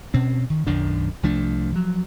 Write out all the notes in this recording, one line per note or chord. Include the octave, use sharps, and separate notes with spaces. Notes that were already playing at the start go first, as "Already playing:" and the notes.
B2 C4 C#4
D#3
B1 F#2 D#3 D4
C2 F3 A3 D4
F3 F#3